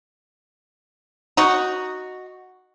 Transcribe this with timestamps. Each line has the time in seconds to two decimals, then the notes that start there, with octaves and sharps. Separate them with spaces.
1.37 D#4 F#4